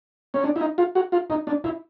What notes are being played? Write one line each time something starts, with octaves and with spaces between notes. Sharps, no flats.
C#4
D4
E4
D#4
F4
F#4
F4
D#4
D4
E4